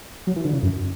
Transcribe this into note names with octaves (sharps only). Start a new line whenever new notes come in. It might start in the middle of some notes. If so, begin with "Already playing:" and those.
F#3
E3
D3
C#3
F#2